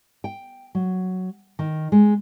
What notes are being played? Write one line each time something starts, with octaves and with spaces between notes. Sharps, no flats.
G5
F#3
D#3
G#3